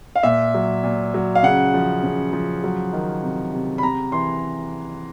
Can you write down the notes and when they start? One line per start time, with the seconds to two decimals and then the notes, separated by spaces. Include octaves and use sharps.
0.15 F5
0.23 A#2 E5
0.54 F#3
0.83 A#2
1.14 F#3
1.35 F5
1.43 C#3 F#5
1.74 F3
2.03 C#3
2.33 F3
2.64 F#3
2.93 D#3
3.23 C3
3.53 C3
3.78 B5
3.83 C3 A#5
4.12 E3 C6